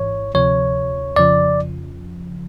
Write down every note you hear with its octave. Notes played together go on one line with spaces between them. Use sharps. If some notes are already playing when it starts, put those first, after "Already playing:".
Already playing: G#1 G#2 E3 C#5
D2 C3 F3 C#5
F2 C#3 F3 D5